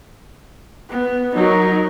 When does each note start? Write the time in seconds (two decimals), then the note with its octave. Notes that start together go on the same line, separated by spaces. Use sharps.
0.90 B3
1.35 F#3 D#4 A#4